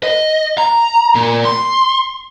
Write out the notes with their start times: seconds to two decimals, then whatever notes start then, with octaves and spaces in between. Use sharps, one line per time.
0.03 D#5
0.58 A#5
1.15 A#2
1.45 C6